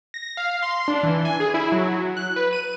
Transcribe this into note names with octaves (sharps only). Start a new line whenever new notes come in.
A#6
F5
C6
D4
E3
G#5
G#4
E4
F#3
F#6
B4
D#7